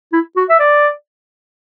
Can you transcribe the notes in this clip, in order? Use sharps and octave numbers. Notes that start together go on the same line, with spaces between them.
E4
F#4
E5
D5